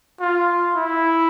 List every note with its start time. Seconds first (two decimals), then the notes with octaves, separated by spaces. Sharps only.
0.21 F4
0.76 E4